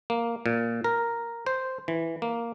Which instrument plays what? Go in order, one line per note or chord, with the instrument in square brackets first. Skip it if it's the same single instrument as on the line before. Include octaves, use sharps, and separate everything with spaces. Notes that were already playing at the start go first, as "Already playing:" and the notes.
[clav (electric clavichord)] A#3
A#2
A#4
C5
E3
A#3